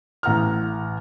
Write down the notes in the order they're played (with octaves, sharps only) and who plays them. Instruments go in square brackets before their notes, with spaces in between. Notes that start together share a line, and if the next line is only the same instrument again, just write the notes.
[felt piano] A1 F#5 A#5 F6